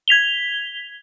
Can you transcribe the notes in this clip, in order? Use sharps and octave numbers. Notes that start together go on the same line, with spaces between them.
G#6 B6 F7 G7